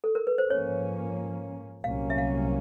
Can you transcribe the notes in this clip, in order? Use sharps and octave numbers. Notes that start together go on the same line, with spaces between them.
A4
A#4
B4
C5
G#2 F3 A#3 C#4 C#5
C2 A#2 F#3 A#3 C#4 F5
E5
F5